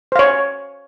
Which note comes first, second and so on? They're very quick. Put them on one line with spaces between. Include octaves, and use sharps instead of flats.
C5 F5 C#5